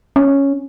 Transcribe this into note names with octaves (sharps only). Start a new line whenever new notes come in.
C#4